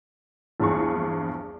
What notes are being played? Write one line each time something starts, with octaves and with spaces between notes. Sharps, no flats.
A#1 E2 G2 G#4 C#6